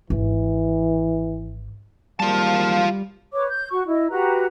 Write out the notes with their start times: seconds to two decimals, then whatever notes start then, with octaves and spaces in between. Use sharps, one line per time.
0.10 G#1 E3
2.20 G#1 G3 A#3 F4 F5 A5
3.32 B4 C#5 D6
3.48 G6
3.71 F#4 C#6
3.86 E4 D#5
4.10 F#4 G4 B4 A#5